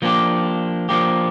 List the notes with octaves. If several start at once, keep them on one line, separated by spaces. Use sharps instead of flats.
F3 A#3 D4 G4
F3 A#3 D4 G4